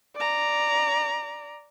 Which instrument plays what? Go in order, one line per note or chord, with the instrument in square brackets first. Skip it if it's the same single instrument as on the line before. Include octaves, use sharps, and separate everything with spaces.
[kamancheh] D5 A#5